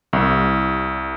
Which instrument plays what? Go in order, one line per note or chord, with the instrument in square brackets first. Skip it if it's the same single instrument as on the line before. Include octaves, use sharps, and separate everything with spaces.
[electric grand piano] C2